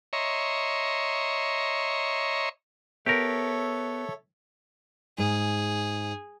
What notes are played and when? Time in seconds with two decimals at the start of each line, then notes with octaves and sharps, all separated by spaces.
0.13 C#5 D#5 E5 A#5 C6 C#6
3.06 B3 G4 A4 A#4 C#5 E5
5.18 G#2 G#4